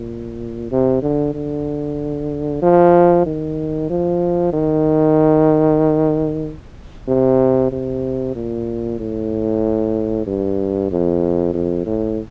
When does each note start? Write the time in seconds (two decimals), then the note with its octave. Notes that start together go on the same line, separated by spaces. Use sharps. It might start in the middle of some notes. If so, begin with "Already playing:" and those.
Already playing: A#2
0.71 C3
1.02 D3
1.34 D3
2.62 F3
3.26 D#3
3.90 F3
4.53 D#3
7.08 C3
7.72 C3
8.35 A#2
9.00 A2
10.27 G2
10.91 F2
11.54 F2
11.86 A2